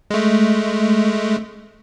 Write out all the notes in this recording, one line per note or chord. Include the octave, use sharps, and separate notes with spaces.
G#3 A3